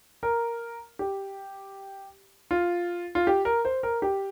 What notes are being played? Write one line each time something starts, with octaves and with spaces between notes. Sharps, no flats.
A#4
G4
F4
F4
G4
A#4
C5
A#4
G4